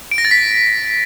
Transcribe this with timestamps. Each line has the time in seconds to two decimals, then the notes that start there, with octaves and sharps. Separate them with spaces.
0.11 D7
0.18 A#6
0.25 A6
0.31 B6